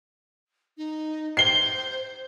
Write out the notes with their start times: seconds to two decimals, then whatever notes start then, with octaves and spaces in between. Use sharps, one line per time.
0.77 D#4
1.37 C5 C7 G7